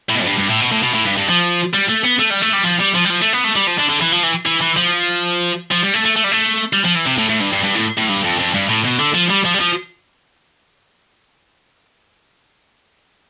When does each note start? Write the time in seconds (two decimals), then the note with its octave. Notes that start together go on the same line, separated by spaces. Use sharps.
0.09 A2
0.16 B2
0.23 F2
0.27 G2
0.38 G2
0.50 A2
0.61 B2
0.72 A2
0.83 B2
0.95 A2
1.06 G2
1.17 G2
1.29 F3
1.74 G3
1.89 A3
2.05 B3
2.20 A3
2.31 G3
2.42 A3
2.53 G3
2.65 F3
2.80 G3
2.95 F3
3.05 G3
3.10 F3
3.22 A3
3.33 B3
3.44 A3
3.56 G3
3.67 F3
3.78 D3
3.90 D3
4.01 E3
4.12 F3
4.23 E3
4.46 E3
4.61 E3
4.76 F3
5.71 F3
5.83 G3
5.94 A3
6.05 A3
6.16 A3
6.24 G3
6.32 A3
6.73 G3
6.85 F3
6.95 E3
7.06 C3
7.18 A2
7.30 A2
7.41 G2
7.53 G2
7.63 G2
7.75 A2
7.98 A2
8.09 G2
8.24 F2
8.39 F2
8.54 G2
8.69 A2
8.85 B2
8.99 D3
9.14 F3
9.30 G3
9.45 F3
9.54 G3
9.60 F3